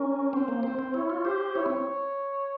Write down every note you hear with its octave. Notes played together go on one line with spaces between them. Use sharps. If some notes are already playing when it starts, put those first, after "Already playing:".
Already playing: C#4 A#4
C4 C5
A#3
C4 C5
C4
E4 C#5
F4
G4 C5
E4 C#5
C4